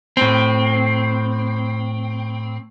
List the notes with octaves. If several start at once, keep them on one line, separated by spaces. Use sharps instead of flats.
A2 C4